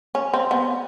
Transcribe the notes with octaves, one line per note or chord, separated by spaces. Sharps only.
C#4
C4
B3